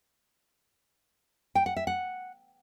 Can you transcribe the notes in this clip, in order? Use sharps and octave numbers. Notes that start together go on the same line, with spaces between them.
G5
F#5
E5
F#5